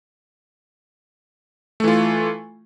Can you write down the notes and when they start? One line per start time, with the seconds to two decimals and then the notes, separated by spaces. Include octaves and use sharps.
1.80 A3
1.84 E3
1.88 F4